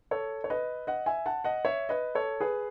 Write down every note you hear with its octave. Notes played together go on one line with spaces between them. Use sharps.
A4 C#5
C#5
B4 D#5
D#5 F#5
E5 G#5
F#5 A5
D#5 F#5
C#5 E5
B4 D#5
A4 C#5
G#4 B4